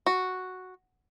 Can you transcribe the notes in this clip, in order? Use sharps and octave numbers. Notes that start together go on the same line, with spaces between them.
F#4